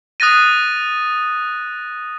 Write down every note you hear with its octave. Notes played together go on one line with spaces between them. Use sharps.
D#6 F#6 A6 A#6 D#7